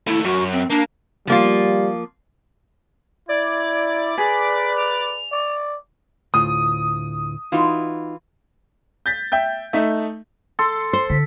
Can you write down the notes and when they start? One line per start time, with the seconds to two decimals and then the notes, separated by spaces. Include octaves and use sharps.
0.07 D#2 A3 E4
0.25 F#2 F#4
0.52 C4
0.70 A#3 D4
1.27 F3 G3 A#3 F4
3.29 E4 D5 G#6
4.18 G#4 B4 B6
4.77 F7
5.32 D5
6.34 D2 A2 F4 D#6
7.52 E3 D#4 F4 F#4
9.06 G6 A6 B6
9.32 E5 G5 G6
9.73 A3 D#4 E5
10.59 A4 C6
10.93 C5
11.10 D3 E4 B6